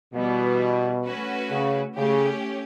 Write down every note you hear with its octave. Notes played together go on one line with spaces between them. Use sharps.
B2 E3 G3 B3
A3 C#4 F#4 B4
C#3
C#3 A3 C#4 G4